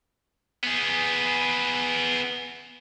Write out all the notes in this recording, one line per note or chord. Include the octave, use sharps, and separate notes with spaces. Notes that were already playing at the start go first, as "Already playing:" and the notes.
B3 G#4